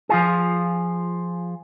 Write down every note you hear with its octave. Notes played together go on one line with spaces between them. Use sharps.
F3 F4 G#4